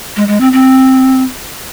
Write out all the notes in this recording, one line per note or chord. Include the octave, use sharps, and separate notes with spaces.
G#3
G#3
C4
C4